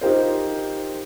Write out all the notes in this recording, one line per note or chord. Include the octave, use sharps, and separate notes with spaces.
D#4 F4 G4 A#4 C5